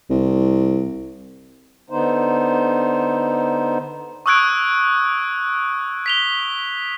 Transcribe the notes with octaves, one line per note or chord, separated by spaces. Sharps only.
C2
D3 B3 D#4 C5
C#6 D#6 E6 F#6 G#6 D7
B6 F7 G7